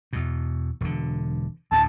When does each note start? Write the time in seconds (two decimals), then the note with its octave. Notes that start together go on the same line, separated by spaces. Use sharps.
0.13 E2 B2
0.81 E1 D3
1.72 D2 A2 A5